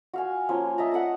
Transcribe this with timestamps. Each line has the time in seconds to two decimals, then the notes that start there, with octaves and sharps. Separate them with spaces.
0.14 F#4 F5 G#5
0.49 F3 A#3 C#4 C6
0.78 D#5 E5 A5 A#5
0.92 F#5 A5 A#5 D#6